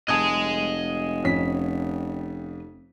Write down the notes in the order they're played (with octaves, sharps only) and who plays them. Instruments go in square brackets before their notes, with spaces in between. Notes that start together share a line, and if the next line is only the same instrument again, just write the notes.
[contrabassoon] F1 [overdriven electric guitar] D#5 G#5 [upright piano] A5 D#6 G#6
[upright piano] F2 C#4 B6